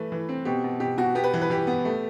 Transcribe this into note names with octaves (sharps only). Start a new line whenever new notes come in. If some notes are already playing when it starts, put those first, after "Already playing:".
Already playing: E3 A3 B4
E3
C4
B2 G4
B2
B2 G4
B2 F#4
B3 G4
B4
E3
B4
E3 G4
B3
A3